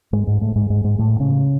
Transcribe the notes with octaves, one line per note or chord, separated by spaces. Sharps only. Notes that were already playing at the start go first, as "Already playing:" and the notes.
G#2 G#3
G#2 G#3
A2 A3
G#2 G#3
G#2 G#3
G#2 G#3
A2 A3
C#3 C#4